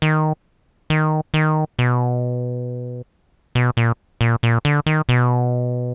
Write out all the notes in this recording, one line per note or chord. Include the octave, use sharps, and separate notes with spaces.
D#3
D#3
D#3
B2
B2
A#2
A#2
A#2
D3
D#3
B2